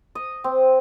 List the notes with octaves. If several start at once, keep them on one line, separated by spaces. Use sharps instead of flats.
D#5
C4